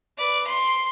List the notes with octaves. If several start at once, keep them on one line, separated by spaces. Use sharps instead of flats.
B4 D5
C6